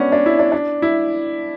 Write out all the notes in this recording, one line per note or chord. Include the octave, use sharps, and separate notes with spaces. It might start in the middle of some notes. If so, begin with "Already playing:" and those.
Already playing: B3 C#4 D4
D4
E4
D4
D4
E4